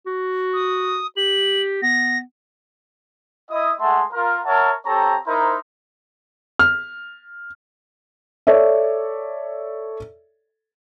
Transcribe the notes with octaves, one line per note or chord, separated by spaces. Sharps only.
F#4
D#6
G4 F#7
B3 A#6
E4 D#5 D#6
G#3 A3 E5 F#5 A5 C6
F4 A#4
A#4 C#5 E5 F#5 A5
C4 G4 A4 C#5 A#5
D#4 E4 A#4 C5
F6
A4 C#5 D5 E5